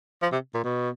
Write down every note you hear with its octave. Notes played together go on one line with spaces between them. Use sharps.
F3
C3
A#2
B2